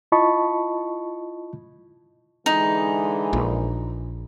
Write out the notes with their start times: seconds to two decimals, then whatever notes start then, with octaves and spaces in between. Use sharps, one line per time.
0.12 E4 F4 D#5 A5 B5 C#6
2.46 D3 E3 G#3 D#4
3.33 A#1